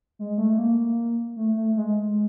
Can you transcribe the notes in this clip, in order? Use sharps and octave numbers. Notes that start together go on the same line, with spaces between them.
G#3
A3
A3
A#3
A3
A3
G#3